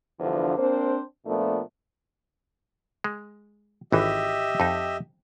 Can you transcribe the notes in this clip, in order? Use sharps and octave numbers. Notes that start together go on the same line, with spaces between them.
E2 G2 D3 F3 C5
A#3 C4 D4 C5
A#2 F3 A3 B3 D4
G#3
G#1 E3 G4 D#5 E5
F2 D#4